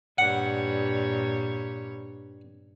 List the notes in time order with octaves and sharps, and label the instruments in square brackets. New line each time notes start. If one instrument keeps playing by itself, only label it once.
[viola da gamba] G2 A#2 C#5 [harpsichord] F#5